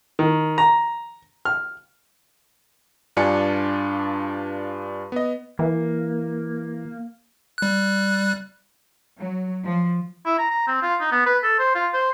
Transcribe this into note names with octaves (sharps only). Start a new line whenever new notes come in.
D#3
A#5
F6
G2 D4 F4 D5 G#5 C#7
B3 D#5
E3 A#3
G3 F#6
F#3
F3
E4
A#5
A#5
C4
F4
D#4
B3
B4
A4
C5
F4
C5